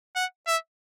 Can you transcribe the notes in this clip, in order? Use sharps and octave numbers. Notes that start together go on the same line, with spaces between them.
F#5
E5